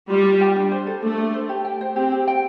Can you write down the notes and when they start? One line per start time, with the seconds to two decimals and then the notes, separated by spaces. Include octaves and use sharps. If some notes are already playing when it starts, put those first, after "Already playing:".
0.09 G3 F4
0.25 F4
0.41 G5
0.56 D4
0.72 C5
0.87 A4
1.02 A3 D4
1.18 D4
1.34 C5
1.49 G4
1.65 G5
1.81 C5
1.96 C4 G4
2.12 G4
2.28 G5